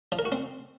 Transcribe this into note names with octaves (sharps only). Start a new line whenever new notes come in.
F3
A#4
F#4
C4